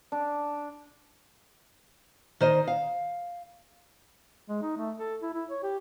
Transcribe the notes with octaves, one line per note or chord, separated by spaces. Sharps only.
D4
D#3 C5 D#5
F5
G#3
D#4
A3
A4
E4
E4
C#5
G4